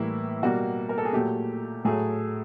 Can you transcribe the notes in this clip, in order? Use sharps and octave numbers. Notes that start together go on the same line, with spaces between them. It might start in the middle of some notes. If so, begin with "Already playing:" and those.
Already playing: A2 E3 G3 A#3 E4
B2 G3 A#3 F#4
A#4
A4
G#4
A#2 F#3 A3 G4
A2 F#3 A3 G#4